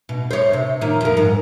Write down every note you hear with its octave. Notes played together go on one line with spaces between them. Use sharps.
B2
C5 C#5
C3
A#2 D#3
F2 A#4
G#2